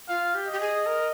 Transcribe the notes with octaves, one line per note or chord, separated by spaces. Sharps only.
F4 F5
G4
G4 D#5
G#4
A#4